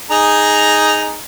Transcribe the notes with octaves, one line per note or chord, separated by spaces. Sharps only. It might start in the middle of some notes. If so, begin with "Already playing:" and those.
D#4 G#4 A#5